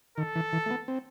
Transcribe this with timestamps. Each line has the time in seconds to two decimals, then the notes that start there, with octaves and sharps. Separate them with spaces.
0.18 D#3 A4
0.35 E3
0.53 E3
0.66 A3
0.70 B3
0.88 C4